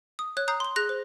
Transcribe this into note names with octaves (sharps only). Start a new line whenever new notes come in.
D#6
C#5 F#6
A#5 D#6 G6 C7
C6 G7
G#4 F#6 A#6
C5